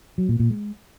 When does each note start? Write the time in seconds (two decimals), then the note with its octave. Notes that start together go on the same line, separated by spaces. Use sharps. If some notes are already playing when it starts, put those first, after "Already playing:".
0.18 F#3
0.29 A#2
0.40 A#2
0.50 G#3